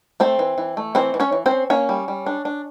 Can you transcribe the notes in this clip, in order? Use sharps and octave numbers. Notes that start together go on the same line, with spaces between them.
A3 C4 C5
E3
E3
A3
E3 C4 C5
E3
C#4 C#5
E3
C4 C5
C#4
A#3 C#4 C#5
G3
G3
D4
D4